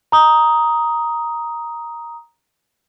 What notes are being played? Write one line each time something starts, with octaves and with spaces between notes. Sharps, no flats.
A#5 D#6